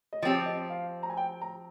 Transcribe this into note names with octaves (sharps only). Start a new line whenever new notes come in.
D#5
F3 C4 G4 C#5
D#5
F5
A#5
G#5
G5
A#5